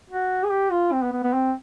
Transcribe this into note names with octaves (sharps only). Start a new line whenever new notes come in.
F#4
G#4
G4
F4
C4
B3
B3
B3
C4